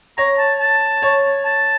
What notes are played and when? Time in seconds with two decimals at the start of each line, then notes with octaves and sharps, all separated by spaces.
0.18 C#5 A#5
0.38 A5
0.60 A5
1.02 C#5
1.45 A5